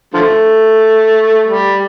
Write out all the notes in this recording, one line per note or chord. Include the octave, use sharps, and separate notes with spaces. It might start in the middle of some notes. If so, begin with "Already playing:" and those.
D3 F3 A3
G3